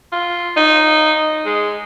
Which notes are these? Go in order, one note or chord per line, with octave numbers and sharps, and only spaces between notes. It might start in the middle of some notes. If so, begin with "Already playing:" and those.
F4
D#4
G#3